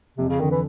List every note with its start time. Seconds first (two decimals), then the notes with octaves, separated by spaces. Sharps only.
0.18 F2 C3
0.29 C#3
0.40 D3 D#3
0.51 E3